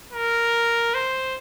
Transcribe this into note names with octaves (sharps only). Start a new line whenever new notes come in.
A#4
C5